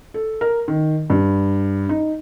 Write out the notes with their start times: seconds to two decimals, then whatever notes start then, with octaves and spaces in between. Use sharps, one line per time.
0.14 A4
0.41 A#4
0.68 D#3
1.10 G2
1.89 D#4